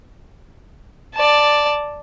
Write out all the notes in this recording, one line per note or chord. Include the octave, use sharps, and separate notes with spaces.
D5 A5